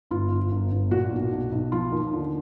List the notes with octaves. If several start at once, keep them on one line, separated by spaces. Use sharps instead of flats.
G1 F4
G1
G1
G1
A#2 F#4
B1
B1
B1
F3 F4
D#2
D3